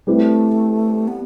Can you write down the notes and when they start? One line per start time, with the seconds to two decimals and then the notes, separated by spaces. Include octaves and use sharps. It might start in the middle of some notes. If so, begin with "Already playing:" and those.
0.07 G3 A3 C4 E4 G4 B4
1.08 B3